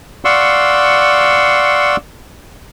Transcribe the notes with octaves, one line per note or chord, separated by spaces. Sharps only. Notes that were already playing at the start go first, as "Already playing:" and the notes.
D5 F5 F#5 C6 C#6 E6